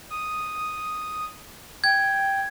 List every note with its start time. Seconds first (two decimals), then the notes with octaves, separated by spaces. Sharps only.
0.10 D#6
1.84 G5 G#6